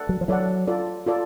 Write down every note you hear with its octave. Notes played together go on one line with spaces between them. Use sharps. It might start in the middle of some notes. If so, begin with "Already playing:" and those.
Already playing: A4 D5 F#5
F#3
F3
F#3 E4 A4 D5 F#5
F4 A4 D5
F4 A4 D5